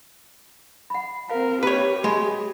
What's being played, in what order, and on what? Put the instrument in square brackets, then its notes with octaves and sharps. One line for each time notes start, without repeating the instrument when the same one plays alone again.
[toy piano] F#5 B5
[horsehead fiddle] C4 A#4 [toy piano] F5
[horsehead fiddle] G4 [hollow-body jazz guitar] B4 C#5
[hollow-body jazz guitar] G#3 [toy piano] E5 B5